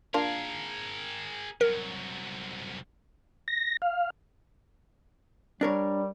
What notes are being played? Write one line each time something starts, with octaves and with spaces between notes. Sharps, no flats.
A#3 D4 F4 G#4 A#4
C2 F#3 A#4
A#6
F5
G3 D4 A#4 C#5